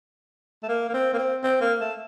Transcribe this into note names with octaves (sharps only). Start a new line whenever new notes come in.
A3
A#3
A#3
C4
A#3
C4
C4
A#3
A3